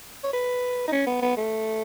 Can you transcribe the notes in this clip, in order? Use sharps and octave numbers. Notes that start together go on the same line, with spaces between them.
C#5
B4
D#4
C#4
B3
B3
A3